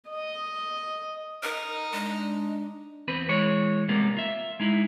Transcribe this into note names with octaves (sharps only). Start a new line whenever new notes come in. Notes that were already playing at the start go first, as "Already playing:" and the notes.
D#5
D#4 A#4 D#5
G#3 D4
E2 C4 B4
E3 G#3 C#5
C3 G3 G#3 A#3 B3
F4 E5
G#3 D#4 E4